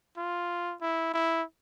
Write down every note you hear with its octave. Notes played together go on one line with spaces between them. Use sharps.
F4
E4
E4